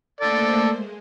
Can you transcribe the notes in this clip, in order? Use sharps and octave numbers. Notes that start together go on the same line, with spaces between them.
A3 A#3 A4 C5 D5
G#3